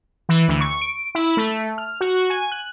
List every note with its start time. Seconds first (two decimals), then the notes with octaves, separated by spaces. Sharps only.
0.29 E3
0.48 D2
0.61 C#6
0.82 D7
1.15 E4
1.37 A3
1.78 F6
2.01 F#4
2.30 G#5
2.52 F#6